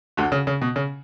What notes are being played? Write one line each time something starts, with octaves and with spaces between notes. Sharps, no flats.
D2 D3
C#3
C#3
B2
C#3